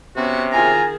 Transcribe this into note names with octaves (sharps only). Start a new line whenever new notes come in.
C3 B3 C#4 F#4
D#3 F4 G#4 G#5 A#5